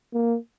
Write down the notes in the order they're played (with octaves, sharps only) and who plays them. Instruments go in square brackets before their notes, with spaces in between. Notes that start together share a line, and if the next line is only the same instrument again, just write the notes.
[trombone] A#3